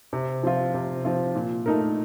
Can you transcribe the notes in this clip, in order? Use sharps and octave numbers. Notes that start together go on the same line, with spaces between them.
C3
F3 C4 F4
C3
F3 C4 F4
A#2
A3 D#4 A#4